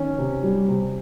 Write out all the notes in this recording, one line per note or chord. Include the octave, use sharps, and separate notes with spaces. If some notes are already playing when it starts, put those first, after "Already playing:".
Already playing: D#3 C#4
C3
G3
C3